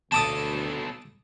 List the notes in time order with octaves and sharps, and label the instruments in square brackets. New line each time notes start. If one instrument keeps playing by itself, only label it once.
[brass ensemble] D2 [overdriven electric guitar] B2 A4 [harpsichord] A5 D6 D#6